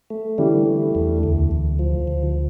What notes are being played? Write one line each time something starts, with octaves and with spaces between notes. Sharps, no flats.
A3
D3 E3 G3
A3
E2
D2
D2
F3
D2